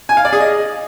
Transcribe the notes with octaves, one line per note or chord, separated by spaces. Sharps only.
G#5
F5
D5
G#4
D#5